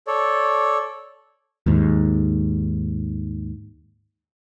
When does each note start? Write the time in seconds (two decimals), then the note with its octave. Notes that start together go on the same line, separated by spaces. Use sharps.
0.07 A4 C#5 D5
1.66 D#2 G#2